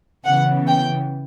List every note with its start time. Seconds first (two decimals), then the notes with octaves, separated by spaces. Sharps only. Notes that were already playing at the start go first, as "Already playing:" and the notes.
0.25 C#3 E3 B3 F#5
0.67 G5